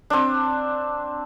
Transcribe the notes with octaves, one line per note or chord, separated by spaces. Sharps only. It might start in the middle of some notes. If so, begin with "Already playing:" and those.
C4 D4